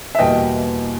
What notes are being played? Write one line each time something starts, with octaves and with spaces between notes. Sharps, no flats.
E5
E2 B2 G3 A#3 D#5 G5